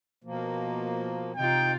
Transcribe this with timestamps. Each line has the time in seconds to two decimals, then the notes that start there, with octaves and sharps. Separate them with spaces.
0.24 B2 F3 A#3
1.36 C3 D#4 F4 G5